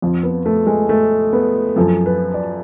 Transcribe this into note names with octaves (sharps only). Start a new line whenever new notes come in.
F2 F3
B3
A3
G#3
A3
B3
F#2 F3 A4
B4
D5